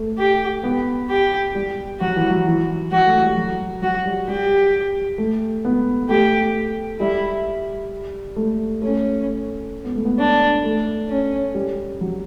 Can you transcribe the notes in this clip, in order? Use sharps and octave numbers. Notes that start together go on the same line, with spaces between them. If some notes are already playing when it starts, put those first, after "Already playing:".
Already playing: A3
G4
B3
G4
G3
F#3 F#4
E3
F#3
E3
F#3 F#4
A3
G3
F#3
F#3 F#4
G3
G3 G4
A3
B3
A3 G4
G3 E4
A3
A3 C#4
B3
A3
B3
D4
A3
C#4
G3
F#3